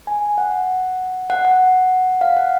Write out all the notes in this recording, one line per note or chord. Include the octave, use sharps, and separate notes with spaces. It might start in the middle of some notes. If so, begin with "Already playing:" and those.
G#5
F#5
F#5
F#5
F5
F#5